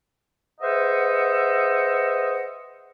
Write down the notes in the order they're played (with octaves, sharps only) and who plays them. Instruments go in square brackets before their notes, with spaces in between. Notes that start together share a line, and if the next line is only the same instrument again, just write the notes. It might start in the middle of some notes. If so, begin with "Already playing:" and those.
[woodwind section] G#4 B4 C5 D#5 E5 F#5